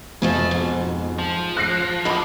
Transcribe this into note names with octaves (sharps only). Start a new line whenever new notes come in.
F2 B2 F3 A3 G#4
G#2
F3
F#6 A#6 C7
F#3 G#3 D#4 B5 D6